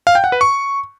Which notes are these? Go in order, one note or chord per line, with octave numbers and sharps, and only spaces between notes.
F5
G5
F#5
B4
C#6